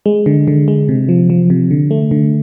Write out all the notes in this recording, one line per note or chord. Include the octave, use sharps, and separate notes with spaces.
G#3
D3
D3
G#3
C3
F3
F3
C3
D3
A3
D3